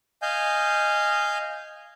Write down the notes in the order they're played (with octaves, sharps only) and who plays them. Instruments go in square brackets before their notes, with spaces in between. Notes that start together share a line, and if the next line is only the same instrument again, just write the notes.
[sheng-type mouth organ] D#5 F5 G#5 G6